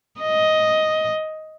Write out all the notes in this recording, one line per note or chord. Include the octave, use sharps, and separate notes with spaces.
D#5